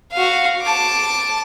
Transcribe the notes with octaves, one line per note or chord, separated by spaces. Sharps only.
F#4 F5
A5 D6